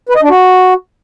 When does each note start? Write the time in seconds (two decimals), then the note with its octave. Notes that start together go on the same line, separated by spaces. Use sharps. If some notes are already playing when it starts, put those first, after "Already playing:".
0.09 B4
0.16 D#5
0.23 D4
0.29 F#4